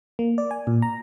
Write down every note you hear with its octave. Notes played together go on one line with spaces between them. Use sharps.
A#3
D5
G#5
A#2
A#5